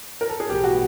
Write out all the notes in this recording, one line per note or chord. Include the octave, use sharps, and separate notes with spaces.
A#4
A4
G#4
B1 A2 E3 G3 B3 G4
F#4